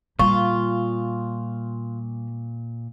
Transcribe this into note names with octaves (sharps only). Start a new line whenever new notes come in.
A#2 G3 F4 C#6